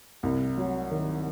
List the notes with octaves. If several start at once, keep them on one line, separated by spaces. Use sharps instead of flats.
C2
F#3
D#3